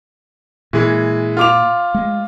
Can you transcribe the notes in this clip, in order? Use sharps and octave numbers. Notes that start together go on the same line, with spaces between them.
A#2 E3 G#3
F4 D6 F7
G#3